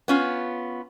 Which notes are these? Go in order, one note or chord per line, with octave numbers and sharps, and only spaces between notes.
B3 C#4 F4